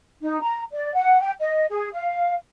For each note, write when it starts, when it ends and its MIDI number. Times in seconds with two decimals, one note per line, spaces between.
0.22 0.39 63
0.41 0.61 82
0.72 0.91 74
0.94 1.21 78
1.21 1.32 79
1.39 1.64 75
1.69 1.88 68
1.92 2.35 77